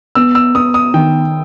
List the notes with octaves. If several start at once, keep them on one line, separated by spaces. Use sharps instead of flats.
B3 E6
E6
B3 D#6
D#6
D#3 G5